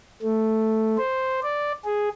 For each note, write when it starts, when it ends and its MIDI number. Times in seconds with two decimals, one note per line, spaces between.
0.23 0.97 57
0.98 1.40 72
1.43 1.72 74
1.85 2.09 68